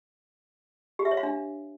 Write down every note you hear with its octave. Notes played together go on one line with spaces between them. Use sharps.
G4
E5
C#5
F5
D4